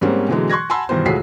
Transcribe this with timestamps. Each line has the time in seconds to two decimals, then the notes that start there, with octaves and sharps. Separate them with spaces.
0.01 G#2 G3 A#3 C4 C#4
0.29 B2 D3 E3 F#3 G#3
0.50 C6 C#6 F#6 G#6 A#6
0.70 F#5 G#5 A5 B5 C6 E6
0.89 G2 B2 D#3 E3 C5
1.05 C#2 A2 F#4 G#4 B6 C7